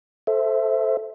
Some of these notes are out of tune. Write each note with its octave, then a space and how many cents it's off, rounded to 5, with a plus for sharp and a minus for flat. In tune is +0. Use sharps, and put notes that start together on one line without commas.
A4 +0 C5 +0 E5 +0